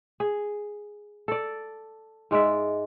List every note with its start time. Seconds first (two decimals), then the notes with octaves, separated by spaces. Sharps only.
0.20 G#4
1.28 A4 D5
2.31 G#2 G#3 D5 E5